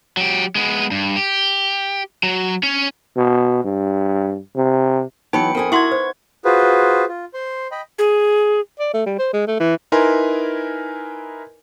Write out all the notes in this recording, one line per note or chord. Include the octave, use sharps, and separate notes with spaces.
F#3 G4
G#3 B3
G2
G4
F#3
C#4 C#5
B2
G2
C3
E3 F#3 B3 D#4 G5 B5 C#6 C#7
F2 F4 A#4 G#5 D#6
E4 F#4 E5 F#5 C6 C#6 G#6 F#7
E4 B4 C5
F4 F#4 G#4 B4 C5
F4
C5 C6
D#5 G5 B5
G#4
D5
A3
G3
C5
G#3
A3
E3
D#4 E4 A#4 B4 G#5 C6